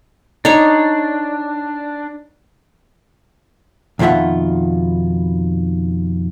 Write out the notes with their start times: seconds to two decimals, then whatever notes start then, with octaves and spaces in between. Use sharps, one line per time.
0.45 D4 D#4 C#5
3.99 F2 B2 D#3 F4 E5 F#5